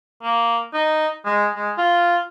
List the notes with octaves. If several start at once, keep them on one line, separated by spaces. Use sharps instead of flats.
A#3
D#4
G#3
G#3
F4